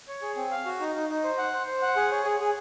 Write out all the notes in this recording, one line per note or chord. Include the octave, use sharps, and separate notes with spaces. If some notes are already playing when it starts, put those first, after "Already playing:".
C#5
G#4
C4
F5
F#4
D#4
D#4
D#4
C5
F#5
C5
C5
F#5
G#4
C#5
G#4
G#4